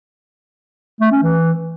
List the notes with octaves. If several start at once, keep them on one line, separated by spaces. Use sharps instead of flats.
A3
C#4
E3